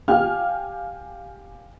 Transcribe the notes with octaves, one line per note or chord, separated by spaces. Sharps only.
G4 F5 G5 G#5 F6